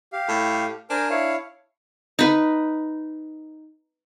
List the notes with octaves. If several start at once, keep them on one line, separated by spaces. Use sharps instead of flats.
G4 F5
A2
D4 A#4 C5 G#5
E4 C#5 F5
D#4 B4